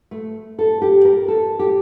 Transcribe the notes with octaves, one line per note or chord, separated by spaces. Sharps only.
A3
A4
G4
A#4
A4
G4